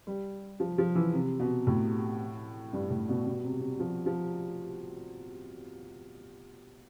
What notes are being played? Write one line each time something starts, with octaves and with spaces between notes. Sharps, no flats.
G3
F3
F3
E3
C3
B2
A2
G2
A2
B2
B2
C3
C3
F3
F3